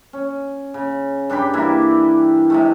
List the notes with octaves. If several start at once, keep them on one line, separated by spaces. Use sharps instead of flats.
C#4
C#3
G2 D4 G4 B5
E3 G3 A#3 E4
C3 G#3 A3